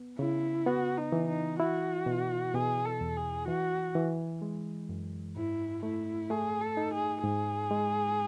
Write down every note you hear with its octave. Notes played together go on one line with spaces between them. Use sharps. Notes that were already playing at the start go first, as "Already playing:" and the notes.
Already playing: B3
C#3 E4
B3 F#4
D#4
E3
D#4
E4 F#4
B2
B2 G#4
A4
E2
G#4
E3 F#4
E3
G#3
F#2
G#2 E4
A3 E4
A3 G#4
A4
D#4
G#4
G#2 G#4
G#3